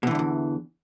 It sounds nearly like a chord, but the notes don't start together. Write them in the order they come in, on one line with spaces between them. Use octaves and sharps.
B2 E3 D3 G2 E2